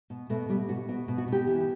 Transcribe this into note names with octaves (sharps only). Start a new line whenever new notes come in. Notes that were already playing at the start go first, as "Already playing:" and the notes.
B2
B2 A3
B2 G3
B2 F#4
B2 F#4
B2
F#4
B2 G4
E3